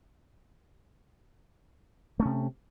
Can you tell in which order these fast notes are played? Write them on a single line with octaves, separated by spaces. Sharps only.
A3 C#4 C3